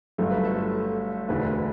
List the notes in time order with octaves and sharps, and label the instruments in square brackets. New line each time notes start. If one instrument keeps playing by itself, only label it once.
[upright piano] G1 G2 F#3 A3 A4
B4
A4
E1 D2 D3 B4
B4